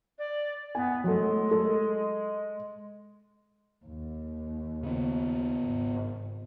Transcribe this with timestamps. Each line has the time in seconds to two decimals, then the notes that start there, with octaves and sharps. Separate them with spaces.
0.18 D5
0.75 B3 G#5
1.04 F#3 G#3 A3
1.51 A4
3.85 D#2
4.83 C#3 B3
5.65 G#1